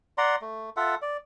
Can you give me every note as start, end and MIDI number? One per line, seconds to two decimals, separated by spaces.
0.18 0.36 74
0.18 0.36 78
0.18 0.36 82
0.18 0.36 84
0.41 0.70 57
0.77 0.95 65
0.77 0.95 69
0.77 0.95 76
0.77 0.95 78
1.02 1.17 74